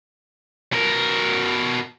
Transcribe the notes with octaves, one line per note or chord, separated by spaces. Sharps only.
B2 A#4